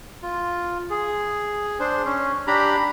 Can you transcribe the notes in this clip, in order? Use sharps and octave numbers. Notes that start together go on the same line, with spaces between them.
F4
G#4
D4 C5
C#4
D4 G4 A#5 B5